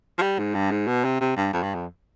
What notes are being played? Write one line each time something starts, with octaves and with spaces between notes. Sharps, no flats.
F3
G3
G#2
G2
G#2
B2
C3
C3
G2
F2
G2
F2